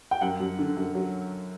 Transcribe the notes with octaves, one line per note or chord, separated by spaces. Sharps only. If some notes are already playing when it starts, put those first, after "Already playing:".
G5
F#2 F#5
F#2
D3
F#2
F#3